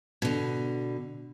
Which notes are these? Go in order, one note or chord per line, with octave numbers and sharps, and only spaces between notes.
B2 D3